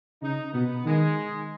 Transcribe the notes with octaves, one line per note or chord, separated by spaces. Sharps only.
C#3 D#4
B2 B3
D#3 G#3